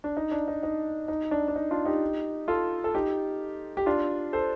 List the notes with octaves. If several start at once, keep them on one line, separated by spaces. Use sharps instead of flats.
D4
D#4
D4
D#4
D#4
D#4
D4
D4
D#4
D4 F4
D#4 G4
F4 A4
A4
D#4 G4
G4
D4 F4
A4 C5